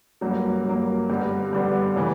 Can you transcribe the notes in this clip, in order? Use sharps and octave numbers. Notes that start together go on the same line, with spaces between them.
G2 F#3 A#3
G2 F#3 A#3
G2 D3 G3 B3
G2 D3 G3 B3
C#3 E3